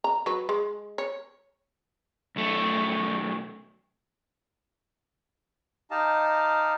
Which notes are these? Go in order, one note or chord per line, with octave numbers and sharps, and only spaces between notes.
A#5
F#3 B4
G#3
C#5
B1 A3
D#4 G4 D#5 F5 A5